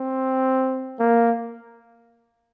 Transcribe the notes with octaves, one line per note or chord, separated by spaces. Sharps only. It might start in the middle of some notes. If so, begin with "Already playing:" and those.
Already playing: C4
A#3